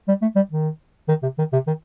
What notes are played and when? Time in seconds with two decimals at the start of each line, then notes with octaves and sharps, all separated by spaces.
0.08 G3
0.22 A3
0.36 G3
0.52 D#3
1.08 D#3
1.23 C3
1.38 D#3
1.53 C3
1.67 D#3